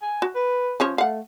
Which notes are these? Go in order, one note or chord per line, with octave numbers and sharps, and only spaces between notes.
G#5
F#4
B4
F3 C#4 C#5
A3 F5 F#5